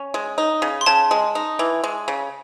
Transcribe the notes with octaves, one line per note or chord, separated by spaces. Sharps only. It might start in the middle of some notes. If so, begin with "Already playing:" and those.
Already playing: C#4
G#3
D#4
C#3
C6
C#3 A5
G#3
D#4
E3
G#3
C#3